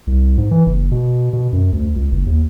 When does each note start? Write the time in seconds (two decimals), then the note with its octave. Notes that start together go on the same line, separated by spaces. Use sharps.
0.07 C2
0.38 G#2
0.51 E3
0.66 F#1
0.91 B2
1.33 B2
1.53 F#2
1.73 D2
1.96 C#2
2.12 F#1
2.27 D#2